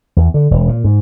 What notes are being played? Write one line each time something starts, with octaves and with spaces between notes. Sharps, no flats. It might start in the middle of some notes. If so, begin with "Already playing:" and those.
E2
D3
E1
A#2
G#2